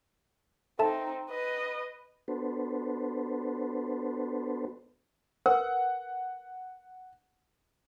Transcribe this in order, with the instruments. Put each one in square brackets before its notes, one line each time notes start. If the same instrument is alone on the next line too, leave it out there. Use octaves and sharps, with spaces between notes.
[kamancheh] C4 D#4 [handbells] A4 E5 A5
[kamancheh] B4 D#5
[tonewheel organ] B3 D4 F#4 A4 B4 C5
[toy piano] A#4 B4 [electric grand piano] F#5